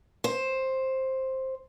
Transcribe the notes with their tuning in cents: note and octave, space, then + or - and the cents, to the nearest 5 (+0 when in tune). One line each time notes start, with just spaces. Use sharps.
C5 +10